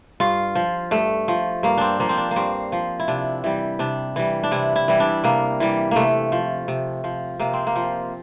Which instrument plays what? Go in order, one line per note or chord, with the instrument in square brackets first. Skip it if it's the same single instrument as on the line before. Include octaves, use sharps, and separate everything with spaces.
[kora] G2 F4
F3
G2 A3
F3
G2 A#3
C4 D4
F3 A#3
C4
D4
A#3
G2 C4
F3
E4
C3 D4
E3 G3
C3 D4
E3 G3
D4
C3 E4
E4
E3 G3
D4
C3 A#3
E3 G3
C3 A3 A#3
F3
C3
F3
C3 A#3
C4
A#3
F3